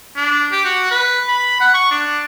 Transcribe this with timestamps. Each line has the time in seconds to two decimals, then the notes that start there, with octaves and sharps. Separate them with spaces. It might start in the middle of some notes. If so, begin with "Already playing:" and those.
0.16 D4
0.52 G4
0.65 F#4
0.91 B4
1.28 B5
1.60 F#5
1.74 C#6
1.91 D4